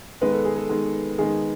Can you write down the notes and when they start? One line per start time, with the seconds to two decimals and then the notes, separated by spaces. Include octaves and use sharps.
0.21 D#3 G#3 B3 B4
0.32 A4
0.45 G#4
0.56 A4
0.69 D#3 G#3 B3
1.18 D#3 G#3 B3 G#4